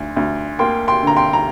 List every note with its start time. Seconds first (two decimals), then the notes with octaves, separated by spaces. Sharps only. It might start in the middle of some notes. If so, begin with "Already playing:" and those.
Already playing: D2
0.16 D2
0.59 A#3 G5 C6
0.88 G5 C6
1.03 D3 A#5
1.16 G5 C6
1.33 A#5